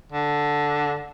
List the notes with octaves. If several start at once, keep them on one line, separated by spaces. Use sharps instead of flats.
D3